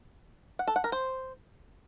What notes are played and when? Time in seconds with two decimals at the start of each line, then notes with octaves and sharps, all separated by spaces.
0.59 F#5
0.67 A4
0.76 F#5
0.84 A#4
0.92 C5